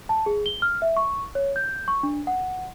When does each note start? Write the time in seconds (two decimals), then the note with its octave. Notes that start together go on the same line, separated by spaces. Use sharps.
0.09 A5
0.26 G#4
0.46 G7
0.62 F6
0.82 E5
0.97 C#6
1.35 C#5
1.56 G6
1.88 C#6
2.03 D4
2.27 F#5